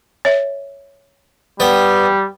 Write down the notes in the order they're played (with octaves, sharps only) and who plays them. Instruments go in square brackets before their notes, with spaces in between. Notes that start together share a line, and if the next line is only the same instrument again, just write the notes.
[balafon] C#5 E5
[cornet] G3 [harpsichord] B3 D5 G5